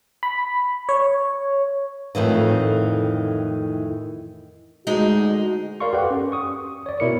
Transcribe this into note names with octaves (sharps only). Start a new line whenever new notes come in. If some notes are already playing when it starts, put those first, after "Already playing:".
B5
C#5
F2 A2 D#3 E3
D2 G#3 D#4 F#4
A#4 D5 F5 C6 C#6
G4 A4 B4 F#5
C#4
C#6 D#6
C#5 D5
B2 E4 A#4 C#7